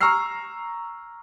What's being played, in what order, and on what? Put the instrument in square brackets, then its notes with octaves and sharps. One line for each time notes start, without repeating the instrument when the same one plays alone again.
[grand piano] A#5 C#6 E6 F6 C7